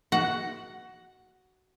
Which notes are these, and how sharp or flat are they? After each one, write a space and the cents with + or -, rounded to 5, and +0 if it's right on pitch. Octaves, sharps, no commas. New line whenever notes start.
F#4 +15 F#5 +0